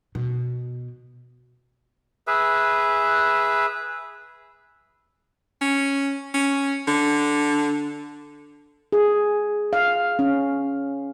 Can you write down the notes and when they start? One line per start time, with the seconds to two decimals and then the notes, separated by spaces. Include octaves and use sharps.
0.15 B2
2.27 G#4 B4 E5
5.62 C#4
6.34 C#4
6.87 D3
8.92 G#4
9.73 F5
10.19 C#4